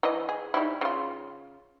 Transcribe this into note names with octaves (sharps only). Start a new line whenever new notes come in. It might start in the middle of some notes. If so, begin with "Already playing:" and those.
E3 D#5
G#4
G3 D#4 E4
C#3 F4